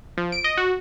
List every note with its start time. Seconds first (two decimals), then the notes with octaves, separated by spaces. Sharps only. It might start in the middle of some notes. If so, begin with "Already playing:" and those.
0.17 F3
0.32 D7
0.44 D#5
0.57 F#4